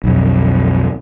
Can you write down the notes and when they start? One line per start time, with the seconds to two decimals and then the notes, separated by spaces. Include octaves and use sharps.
0.04 B1 F2